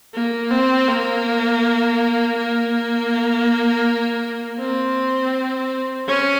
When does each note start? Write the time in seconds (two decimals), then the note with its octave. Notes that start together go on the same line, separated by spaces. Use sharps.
0.14 A#3
0.51 C4
0.88 A#3
2.37 A#3
4.59 C4
6.08 C#4